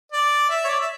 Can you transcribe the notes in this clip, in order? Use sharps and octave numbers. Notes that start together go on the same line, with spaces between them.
D5
E5
C#5
D5
E5